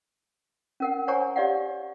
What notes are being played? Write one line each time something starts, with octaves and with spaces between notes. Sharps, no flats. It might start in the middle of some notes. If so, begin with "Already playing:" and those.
C#4 A#4 F#5
C5 C#5 F#5 G#5 A#5 C#6
G4 C#5 D5 F5 F#5